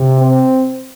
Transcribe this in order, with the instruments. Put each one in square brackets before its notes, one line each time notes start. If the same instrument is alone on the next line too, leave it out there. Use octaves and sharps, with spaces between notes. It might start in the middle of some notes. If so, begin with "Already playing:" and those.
Already playing: [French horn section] C3
[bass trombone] C4